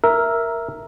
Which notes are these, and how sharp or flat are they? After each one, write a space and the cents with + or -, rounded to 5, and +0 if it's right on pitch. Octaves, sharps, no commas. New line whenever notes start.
A#4 +0 E5 +0